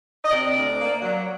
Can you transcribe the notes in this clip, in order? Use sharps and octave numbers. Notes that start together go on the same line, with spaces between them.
D#5
C3 D5
D2
A#3
F#3